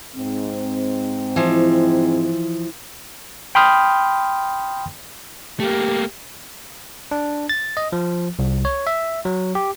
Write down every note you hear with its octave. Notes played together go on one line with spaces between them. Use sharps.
G#2 C4
E3 F3
G5 B5 C6 D#6 F6 G6
A3 A#3 G4
D4
A6
D#5
F3
C2
C#5
E5
F#3
G4